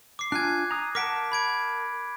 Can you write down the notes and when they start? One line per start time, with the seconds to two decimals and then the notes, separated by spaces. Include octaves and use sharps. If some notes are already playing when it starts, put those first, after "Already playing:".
0.19 D6 C7
0.32 D4 F4 G#5 F#6 G#6
0.71 A#5 D#6
0.95 A#4 F#5 A5 D6 B6 D7
1.32 B5 G#6 D7